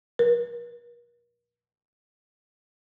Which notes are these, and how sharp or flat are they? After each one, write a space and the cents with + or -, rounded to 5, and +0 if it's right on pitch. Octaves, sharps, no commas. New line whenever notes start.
A#4 +40